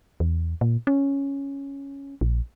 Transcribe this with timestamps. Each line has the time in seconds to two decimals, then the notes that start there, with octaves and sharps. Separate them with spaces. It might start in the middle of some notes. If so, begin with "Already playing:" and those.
0.20 E2
0.61 A#2
0.87 C#4
2.21 A#1